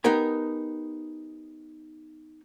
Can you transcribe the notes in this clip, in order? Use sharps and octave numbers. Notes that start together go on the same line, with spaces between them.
B3 D#4 G4 A#4 G#5